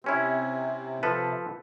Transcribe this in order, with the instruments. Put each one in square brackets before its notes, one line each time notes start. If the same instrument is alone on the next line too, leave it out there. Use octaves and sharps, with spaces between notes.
[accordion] C3 [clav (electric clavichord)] C4 C#4 E4
[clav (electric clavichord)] F3 A4 B4